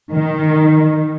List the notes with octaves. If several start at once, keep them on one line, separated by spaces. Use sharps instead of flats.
D#3